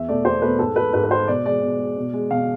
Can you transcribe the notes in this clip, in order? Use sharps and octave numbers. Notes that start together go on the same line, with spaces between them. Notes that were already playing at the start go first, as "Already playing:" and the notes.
Already playing: E2 E5
B2 A3 D5
E2 C5
B2 A3 B4
G#2 A4
G#3 B4
G#2 B4
B4
G#3 C5
B2 D5
G#3 D5
B2
G#3
B2
G#3
B2 F5